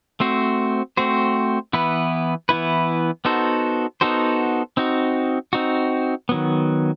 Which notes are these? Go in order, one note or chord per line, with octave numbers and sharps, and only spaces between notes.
A3 C4 F#4 C5
A3 C4 F#4 C5
E3 B3 E4 B4
E3 B3 E4 B4
B3 D#4 F#4 A4 C5
B3 D#4 F#4 A4 C5
C4 D#4 F#4
C4 D#4 F#4
D#3 F#3 B3